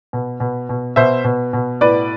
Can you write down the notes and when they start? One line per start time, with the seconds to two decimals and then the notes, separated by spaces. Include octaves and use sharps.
0.13 B2
0.40 B2
0.69 B2
0.96 B2 C5 E5
1.24 B2
1.53 B2
1.81 A2 B4 D5